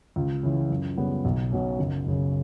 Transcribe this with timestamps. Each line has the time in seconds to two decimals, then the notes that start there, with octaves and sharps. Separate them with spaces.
0.16 C#2
0.43 C#3 E3
0.70 F#2
0.97 C#3 G3 B3
1.25 B1
1.51 B2 F#3 C#4
1.79 F#1
2.06 F#2 C#3